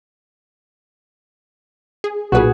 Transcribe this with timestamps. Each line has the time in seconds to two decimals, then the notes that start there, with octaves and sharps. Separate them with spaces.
2.04 G#4
2.32 B1 A#2 F#4 G#4 B4